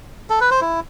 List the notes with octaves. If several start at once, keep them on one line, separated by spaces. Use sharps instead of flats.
A4
B4
C5
E4